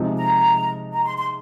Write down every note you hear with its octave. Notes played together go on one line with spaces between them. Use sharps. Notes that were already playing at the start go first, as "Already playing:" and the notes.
Already playing: C3 F3 G#3 D#4
A#5
A#5
C6
C6